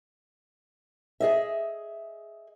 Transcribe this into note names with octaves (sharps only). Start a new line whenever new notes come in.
G#4 D#5 E5